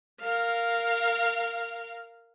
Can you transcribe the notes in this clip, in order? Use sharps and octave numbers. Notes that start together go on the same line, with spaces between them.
A#4 F5